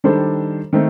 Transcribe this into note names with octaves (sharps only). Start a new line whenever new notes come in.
D#3 G3 D4 A4 C5
D#3 A3 C4